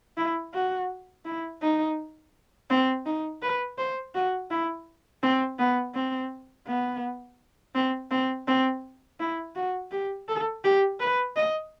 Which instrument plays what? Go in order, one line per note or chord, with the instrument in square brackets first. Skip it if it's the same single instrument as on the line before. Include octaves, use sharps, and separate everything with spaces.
[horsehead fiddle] E4
F#4
E4
D#4
C4
D#4
B4
C5
F#4
E4
C4
B3
C4
B3
C4
C4
C4
E4
F#4
G4
A4
G4
B4
D#5